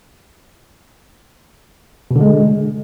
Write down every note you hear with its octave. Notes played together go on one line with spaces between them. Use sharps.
B2
D3
G#3